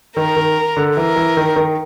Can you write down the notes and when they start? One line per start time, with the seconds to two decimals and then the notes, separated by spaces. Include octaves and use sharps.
0.17 D#3 A#4
0.37 D#3
0.77 D3
0.97 E3 A#4
1.16 E3
1.37 D#3
1.56 D#3